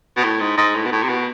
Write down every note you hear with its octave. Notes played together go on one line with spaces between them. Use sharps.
B2
A2
G#2
G#2
A2
B2
A2
C3
B2